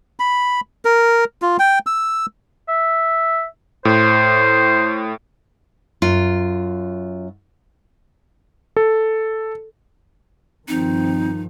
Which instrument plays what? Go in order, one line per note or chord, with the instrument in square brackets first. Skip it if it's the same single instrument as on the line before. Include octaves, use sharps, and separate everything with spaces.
[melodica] B5
A#4
F4
G5
E6
[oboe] E5
[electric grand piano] A2 [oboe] C5
[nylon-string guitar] F#2 F4
[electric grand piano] A4
[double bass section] G2 D#3 F3 [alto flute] C4 [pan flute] D#4